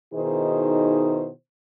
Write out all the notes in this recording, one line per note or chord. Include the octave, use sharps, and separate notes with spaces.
B2 D#3 D#4 E4 G#4 C5